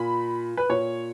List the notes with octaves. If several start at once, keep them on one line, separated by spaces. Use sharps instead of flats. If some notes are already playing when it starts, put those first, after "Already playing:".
Already playing: A#2 B5
B4
A#2 C#5